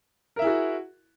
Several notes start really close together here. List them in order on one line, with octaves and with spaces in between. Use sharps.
A#4 E5 E4 G#4 F#4